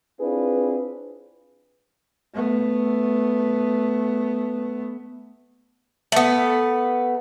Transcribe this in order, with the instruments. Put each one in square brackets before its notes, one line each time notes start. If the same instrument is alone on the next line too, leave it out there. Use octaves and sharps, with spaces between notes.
[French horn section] C4 D4 E4 F4 G#4 B4
[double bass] A3 B3
[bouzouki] A3 B3